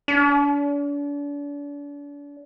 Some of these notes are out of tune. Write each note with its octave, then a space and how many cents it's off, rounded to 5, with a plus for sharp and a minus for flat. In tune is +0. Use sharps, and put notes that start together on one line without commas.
D4 -40